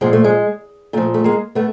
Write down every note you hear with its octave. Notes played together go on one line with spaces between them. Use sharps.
A#2 F3 G#3
A3
G#3
A#2 F3 A3
A3
G#3 A#3
A3 B3